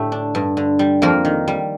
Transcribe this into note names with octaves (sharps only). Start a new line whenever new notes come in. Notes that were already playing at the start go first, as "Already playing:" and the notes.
Already playing: A2 D3 A3 G4
D4
G2
D3
G3
F2 A#3 A#4
D#3
G3